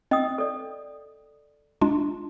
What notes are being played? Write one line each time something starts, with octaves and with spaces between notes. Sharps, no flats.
C4 D#5 G5 D#6
A4 D5
G#3 D4 F4